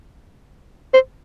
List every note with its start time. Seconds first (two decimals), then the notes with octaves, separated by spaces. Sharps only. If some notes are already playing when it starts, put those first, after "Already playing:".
0.94 C5